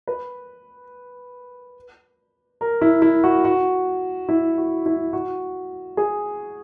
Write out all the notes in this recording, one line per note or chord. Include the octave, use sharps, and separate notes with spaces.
B4
A#4
E4
E4
F#4
F#4
E4
F#4
E4
F#4
G#4